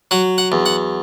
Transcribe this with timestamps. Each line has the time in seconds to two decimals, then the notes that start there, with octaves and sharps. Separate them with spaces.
0.11 F#3 F#5
0.38 F#5
0.52 E2
0.66 F#5